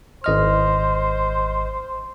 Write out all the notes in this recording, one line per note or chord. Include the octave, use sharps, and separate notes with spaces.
G#1 C5 D#5 F6